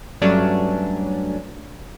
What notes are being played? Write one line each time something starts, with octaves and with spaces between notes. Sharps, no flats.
G2 F#3 A3 C#4 D4